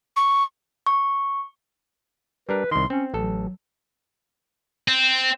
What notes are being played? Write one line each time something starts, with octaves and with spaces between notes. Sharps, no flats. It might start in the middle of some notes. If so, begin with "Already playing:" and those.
C#6
C#6
G3 D4 A#4 B4
C2 D#3 C6
C4 C#4
A1 F#3 A4
C4